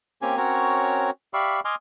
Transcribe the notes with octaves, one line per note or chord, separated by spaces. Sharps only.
A#3 C4 C#4 G4 G#5
C4 C#4 F#4 A#4 C#5
G4 D5 E5 F5 B5 C#6
D#5 G#5 C6 D6 F6